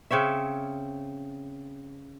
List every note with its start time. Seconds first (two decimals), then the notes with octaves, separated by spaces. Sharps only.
0.11 C#3 C4 C#5 E5